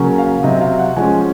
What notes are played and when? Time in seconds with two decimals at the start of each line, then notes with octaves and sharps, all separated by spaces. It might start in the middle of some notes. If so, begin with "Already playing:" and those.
Already playing: C#3 F#3 A#3 C#4
0.18 F5
0.43 C3 F#3 C4 D#5
0.61 F5
0.79 F#5
0.97 F3 G#3 C#4 G#5